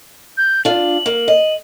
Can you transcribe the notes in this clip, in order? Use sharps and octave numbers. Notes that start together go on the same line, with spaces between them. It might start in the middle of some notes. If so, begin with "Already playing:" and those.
G6
D4 F4 F#7
A#3
D#5